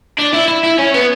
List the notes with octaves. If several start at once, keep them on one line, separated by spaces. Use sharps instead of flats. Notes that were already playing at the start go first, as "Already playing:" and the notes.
D4
E4
E4
E4
C#4
B3